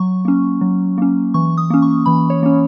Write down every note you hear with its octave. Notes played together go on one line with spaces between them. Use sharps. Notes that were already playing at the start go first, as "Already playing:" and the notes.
Already playing: F#3 C#6
A#3 C#4
F#3
A#3 C#4
E3 C#6
D#6
A#3 C#4
C#6
E3 B5
C#5
A#3 C#4